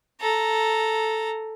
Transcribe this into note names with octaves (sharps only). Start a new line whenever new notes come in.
A4 A#5